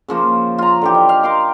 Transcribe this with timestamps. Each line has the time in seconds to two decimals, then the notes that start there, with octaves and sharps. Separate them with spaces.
0.08 C#3 F3 A#3
0.58 F4 A#5
0.82 D3 E3 G4
0.94 D#5
1.09 F5
1.24 A#4 C6 D6